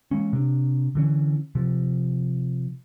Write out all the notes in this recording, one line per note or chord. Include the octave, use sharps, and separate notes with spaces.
E3 G#3 A#3 C#4
C3 D4
D3 E3 C#4
C3 F3